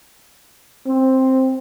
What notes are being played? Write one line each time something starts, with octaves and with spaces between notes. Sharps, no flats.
C4